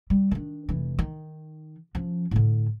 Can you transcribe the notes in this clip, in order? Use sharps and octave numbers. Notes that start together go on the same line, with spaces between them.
G3
D#3 D4
F1 E3
D#3
F3 C#4
A2 D3